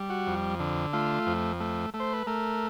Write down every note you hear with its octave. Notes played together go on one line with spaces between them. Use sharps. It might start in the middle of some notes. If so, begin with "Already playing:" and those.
Already playing: G3
F#4
F2
D3
A3 F4
F2
A3
A3
C5
B4
A3 A#4